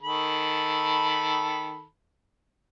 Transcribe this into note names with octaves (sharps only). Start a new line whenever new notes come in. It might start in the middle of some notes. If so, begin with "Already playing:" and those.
D#3 A4 B5